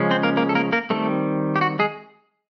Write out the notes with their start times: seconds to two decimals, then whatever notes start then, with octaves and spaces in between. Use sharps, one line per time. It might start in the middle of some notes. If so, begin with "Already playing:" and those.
Already playing: C#3 F3 G#3 C#4
0.11 C4 C5
0.23 A#3 A#4
0.37 A#3 A#4
0.49 A4
0.55 A#3 A#4
0.72 A#3 A#4
0.90 D#3 G3 A3 C4 A4
1.56 G4
1.61 F#4
1.79 G#3 G#4